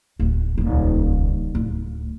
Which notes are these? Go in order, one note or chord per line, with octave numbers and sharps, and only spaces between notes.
D1 D4
D#1 C#2
D1